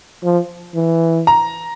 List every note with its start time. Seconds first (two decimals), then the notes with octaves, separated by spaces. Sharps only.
0.23 F3
0.75 E3
1.27 A#5